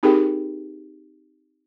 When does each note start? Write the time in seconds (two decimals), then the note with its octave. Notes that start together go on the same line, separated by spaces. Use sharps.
0.03 C4 D#4 G4 G#4 A#4 G5